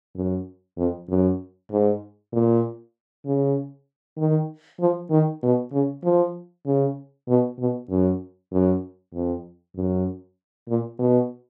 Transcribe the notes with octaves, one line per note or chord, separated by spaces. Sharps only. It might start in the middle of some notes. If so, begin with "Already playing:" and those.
F#2
F2
F#2
G#2
A#2
C#3
D#3
F3
D#3
B2
C#3
F3
C#3
B2
B2
F#2
F#2
F2
F#2
A#2
B2